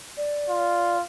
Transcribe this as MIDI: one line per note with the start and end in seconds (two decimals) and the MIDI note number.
0.17 0.97 74
0.49 1.03 65